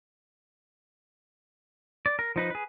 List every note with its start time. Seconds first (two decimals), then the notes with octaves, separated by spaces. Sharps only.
2.06 D5
2.19 A#4
2.36 F3 D#4 B4
2.50 G#4 B4